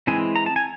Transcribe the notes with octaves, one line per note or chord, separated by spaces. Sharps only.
E3 G#3 C4 E4 G#5
A#5
A5
G#5